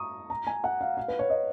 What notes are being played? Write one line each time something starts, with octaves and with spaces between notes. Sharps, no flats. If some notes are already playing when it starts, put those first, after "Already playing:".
Already playing: A#5 C#6 D#6
A#5
G#5
F#5
F5
F5
B4
C#5
D#5